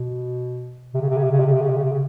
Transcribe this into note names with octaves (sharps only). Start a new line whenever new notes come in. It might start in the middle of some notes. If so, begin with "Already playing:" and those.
Already playing: B2
C3
C#3
C3
C#3
C3
C#3
C3
C#3
C3
C#3
C3
C#3
C3
C#3